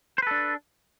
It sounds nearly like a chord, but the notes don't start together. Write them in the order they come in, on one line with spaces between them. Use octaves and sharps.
C5 B4 A4 D4